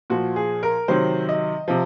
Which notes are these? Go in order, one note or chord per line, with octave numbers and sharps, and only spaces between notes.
A#2 F3 F#4
G#4
A#4
C3 D#3 F#3 C5
D#5
C3 F3